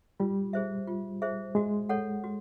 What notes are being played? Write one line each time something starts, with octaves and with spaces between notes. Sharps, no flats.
G3 F4
G#4 C5 E5
F4
G#4 C5 E5
G#3 F#4
A4 C#5 F#5
F#4